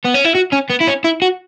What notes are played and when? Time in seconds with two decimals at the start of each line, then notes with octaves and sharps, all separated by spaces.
0.05 B3
0.14 C#4
0.25 E4
0.35 F#4
0.52 C#4
0.70 B3
0.80 E4
0.87 C#4
1.04 E4
1.22 F#4